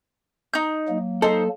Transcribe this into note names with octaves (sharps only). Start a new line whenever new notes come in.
D#4 G6
F#3 A#3
D#4 A4 C5